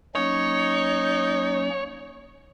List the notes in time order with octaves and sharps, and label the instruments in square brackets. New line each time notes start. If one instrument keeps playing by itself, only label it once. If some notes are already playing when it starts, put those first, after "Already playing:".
[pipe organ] F#3 A#3 C#4 [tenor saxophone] D#4 [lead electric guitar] C#5